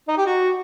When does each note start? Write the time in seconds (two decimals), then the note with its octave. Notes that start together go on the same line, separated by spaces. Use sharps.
0.08 D#4
0.17 G4
0.26 F#4